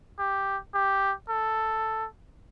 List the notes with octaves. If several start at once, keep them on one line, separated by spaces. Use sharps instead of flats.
G4
G4
A4